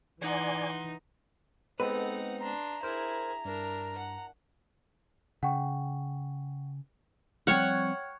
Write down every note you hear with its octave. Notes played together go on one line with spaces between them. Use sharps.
E3 D#4 D5 F#5 G#5 C6
G#3 B3 C4 D#4 A4 B4 F#5
D4 A#5 C6
E4 G#4 A#4 C5
G2 D4 A#4
F#5
C#3 F#5 G5 C#6
F3 G3 C4 C#5 F#5 G5 F6